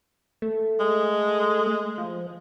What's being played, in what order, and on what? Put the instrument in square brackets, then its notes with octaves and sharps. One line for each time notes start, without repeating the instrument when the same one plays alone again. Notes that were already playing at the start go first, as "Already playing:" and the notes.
[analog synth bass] A3
[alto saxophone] G#3
[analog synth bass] F3